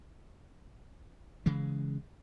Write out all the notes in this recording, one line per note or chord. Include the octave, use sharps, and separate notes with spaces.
C#3 E3 G#3